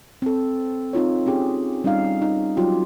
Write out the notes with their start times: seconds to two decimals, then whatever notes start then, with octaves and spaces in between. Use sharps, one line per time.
0.22 C4 A4
0.93 C4 D#4 F4 C#5
1.26 C4 C#4 G4 G#4
1.84 G3 C#4 D#4 F5
2.22 D#4
2.57 F#3 G3 F4 G4